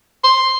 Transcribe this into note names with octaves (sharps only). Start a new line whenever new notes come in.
C6